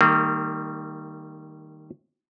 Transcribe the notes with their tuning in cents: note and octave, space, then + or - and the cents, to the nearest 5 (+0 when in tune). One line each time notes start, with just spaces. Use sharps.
D#3 +0 G3 +0 A#3 -40